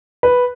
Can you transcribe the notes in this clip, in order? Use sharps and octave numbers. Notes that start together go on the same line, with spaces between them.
B4